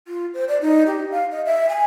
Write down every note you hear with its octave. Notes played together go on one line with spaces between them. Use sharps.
F4
C5
D5
D#4
G4
F5
D#5
E5
G#5